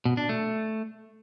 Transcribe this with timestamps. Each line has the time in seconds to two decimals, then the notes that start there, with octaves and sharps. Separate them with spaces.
0.05 B2
0.17 D4
0.29 A3